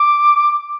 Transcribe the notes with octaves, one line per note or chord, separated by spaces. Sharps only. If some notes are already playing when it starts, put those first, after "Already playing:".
Already playing: D6